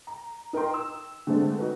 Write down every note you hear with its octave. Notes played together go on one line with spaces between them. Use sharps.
A#5
D#4 A#4 D#5 G5 C6
E6
D3 G#3 A3 C4 D4
D#4 F#4 B4